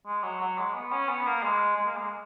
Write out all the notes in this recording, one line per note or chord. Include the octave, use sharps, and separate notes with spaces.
G#3
F#3
F#3
G#3
B3
C#4
B3
A#3
G#3
G#3
A#3
G#3